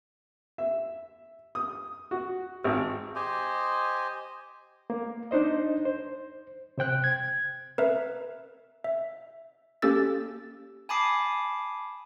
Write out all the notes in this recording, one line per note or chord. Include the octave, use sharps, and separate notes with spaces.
E5
D#6
F#4
G#1
G4 C5 D#5 G#5
A#3
D4 D#4 C5 D#5
C5
C3 C5 G5 F#6
G#6
A#4 B4 E5
E5
A#3 C#4 G4 A4 E6 A6
G#5 A5 B5 D6 D#6 C7